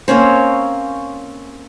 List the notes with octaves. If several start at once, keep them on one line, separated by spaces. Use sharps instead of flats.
A#3 C4 C#4 C5